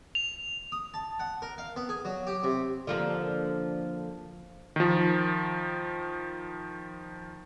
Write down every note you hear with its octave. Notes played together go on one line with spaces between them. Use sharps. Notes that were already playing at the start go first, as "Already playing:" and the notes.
F7
D#6
A5
F#5
A#4
F5
B3
G#4
F#3
G4
C3
D3 F3 A#3
D#3 F3